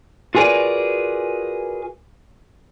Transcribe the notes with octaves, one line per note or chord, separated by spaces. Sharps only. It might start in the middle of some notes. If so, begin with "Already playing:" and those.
F4 F#4 G#4 A#4 B4 D5